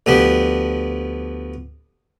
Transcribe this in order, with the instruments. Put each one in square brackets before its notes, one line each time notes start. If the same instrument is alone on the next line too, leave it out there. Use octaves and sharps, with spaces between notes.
[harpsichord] D2 F3 B3 G4